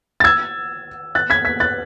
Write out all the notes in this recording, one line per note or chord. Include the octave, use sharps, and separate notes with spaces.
A6
E6 G#6
F#6 A6
G#6 B6
G#6 B6
F#6 A6